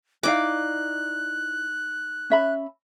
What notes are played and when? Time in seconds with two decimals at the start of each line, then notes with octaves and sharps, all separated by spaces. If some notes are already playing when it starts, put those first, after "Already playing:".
0.23 D#4 E4 D5 F5 D6 F#6
2.30 C#4 E5 B5